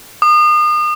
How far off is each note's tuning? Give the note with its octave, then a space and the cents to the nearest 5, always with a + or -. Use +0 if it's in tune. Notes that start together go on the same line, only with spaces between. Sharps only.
D#6 -35